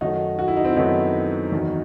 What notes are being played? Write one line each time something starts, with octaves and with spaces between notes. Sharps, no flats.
F#2 D#3 A3 D#4 F#4
F#4
E4
D#4
C4 E4
F#2 D#3 A3 B3 D#4
E2 D#3 F#3